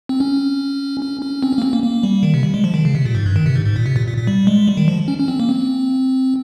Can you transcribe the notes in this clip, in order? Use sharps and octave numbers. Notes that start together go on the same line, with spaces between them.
C4
C#4
C#4
C#4
C4
C#4
A#3
C4
A#3
A#3
G3
D#3
C3
G3
G#3
F3
D#3
C#3
C3
A#2
G#2
G2
D#3
C3
G#2
G#2
A#2
C3
A#2
A#2
A#2
G3
G#3
G3
D#3
F3
C#4
C#4
C4
A#3
C4